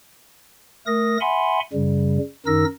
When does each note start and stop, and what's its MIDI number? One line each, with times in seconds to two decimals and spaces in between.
0.87 1.17 57
0.87 1.17 70
0.87 1.17 87
0.87 1.17 94
1.21 1.60 76
1.21 1.60 78
1.21 1.60 80
1.21 1.60 83
1.21 1.60 84
1.73 2.18 42
1.73 2.18 49
1.73 2.18 55
2.46 2.64 42
2.46 2.64 51
2.46 2.64 63
2.46 2.64 70
2.46 2.64 88
2.46 2.64 94